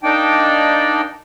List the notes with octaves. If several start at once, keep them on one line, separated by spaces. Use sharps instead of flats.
A#3 D4 D#4 D5 G5